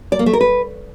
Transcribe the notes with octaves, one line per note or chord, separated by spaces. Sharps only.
D5
A#3
A3
A#4
B4